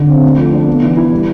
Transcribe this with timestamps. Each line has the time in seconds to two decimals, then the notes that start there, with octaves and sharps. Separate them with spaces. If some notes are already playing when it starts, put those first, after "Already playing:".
Already playing: D3 A4
0.09 C4
0.23 A3
0.38 F3
0.53 D4
0.68 B3
0.82 E3
0.97 E4
1.12 G3